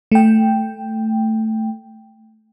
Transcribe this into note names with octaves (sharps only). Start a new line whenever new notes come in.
A3 G5